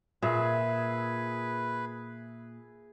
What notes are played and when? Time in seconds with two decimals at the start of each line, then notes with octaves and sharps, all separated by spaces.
0.22 A#2 G#4 B4 E5